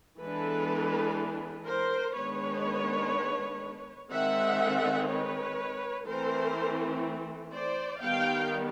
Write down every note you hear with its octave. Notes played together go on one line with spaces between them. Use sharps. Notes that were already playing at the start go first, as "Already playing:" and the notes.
E3 G#3 B3 D4 A4 B4
A#4 C5
D#3 G#3 B3 D4 B4 C#5
D#3 G#3 C4 E5 F#5
B4 C#5
E3 A3 C4 A#4 C5
C5 D5
D#3 G3 B3 F5 G5